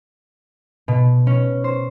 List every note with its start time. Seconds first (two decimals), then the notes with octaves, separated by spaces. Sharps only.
0.88 B2
1.27 C#4
1.64 C5